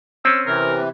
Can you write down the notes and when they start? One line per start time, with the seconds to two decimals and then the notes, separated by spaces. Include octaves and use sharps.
0.25 C4 C#4 E6
0.46 C3 E3 A#4